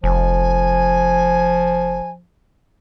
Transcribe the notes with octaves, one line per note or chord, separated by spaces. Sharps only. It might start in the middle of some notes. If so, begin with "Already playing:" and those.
F1 F3 G#5